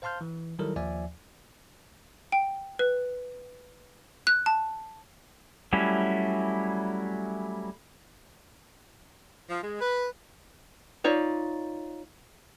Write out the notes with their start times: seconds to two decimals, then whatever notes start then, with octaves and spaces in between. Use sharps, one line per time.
0.02 C5 F5 A5 C6 F6 G6
0.21 E3
0.59 D#3 F#3 G3 E4 A4 A#4
0.76 D#2 F3 D5 E5 G#5
2.32 G5
2.79 B4
4.27 F#6
4.46 A5
5.73 F#3 G3 A3 C#4 E4
9.49 F3
9.63 G#3
9.81 B4
11.04 D#4 F4 C#5 D5